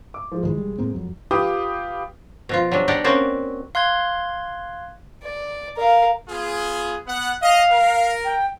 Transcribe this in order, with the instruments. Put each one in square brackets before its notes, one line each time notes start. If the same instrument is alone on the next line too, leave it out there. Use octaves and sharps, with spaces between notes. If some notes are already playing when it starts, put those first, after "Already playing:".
[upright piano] D6
F3 G#3
[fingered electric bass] G#2 D#3 E3 [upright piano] G#3
[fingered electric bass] E1 G3
A2 A#3 C4
F2 F#3
[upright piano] F4 G4 B4 F5 D6 D#6
[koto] B2 F3 F4
F#3 G3 D4
D4 D#4 G4 D5 F#5 G5
A#3 C4 C#4 F#4 C5 D5
[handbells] F5 C6 F#6 G#6
[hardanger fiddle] D5
A#4 F5
[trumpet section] B3 F4 G#4
B3 F#5
[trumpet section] D#5 [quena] F5
[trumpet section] A#4
[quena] G5